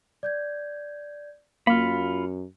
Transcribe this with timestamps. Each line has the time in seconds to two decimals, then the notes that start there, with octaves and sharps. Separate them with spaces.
0.23 D5 G6 G#6
1.67 F#2 A#3 F4 B5 F6 C#7